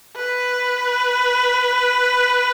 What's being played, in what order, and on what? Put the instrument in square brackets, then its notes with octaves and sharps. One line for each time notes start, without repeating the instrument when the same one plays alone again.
[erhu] B4